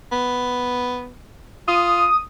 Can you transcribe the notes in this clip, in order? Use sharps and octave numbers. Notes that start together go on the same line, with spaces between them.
B3
F4 D#6